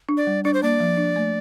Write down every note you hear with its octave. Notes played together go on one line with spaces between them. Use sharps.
D4
D5
G3
D4 D5
C5
A#3 D5
F3
D4
A3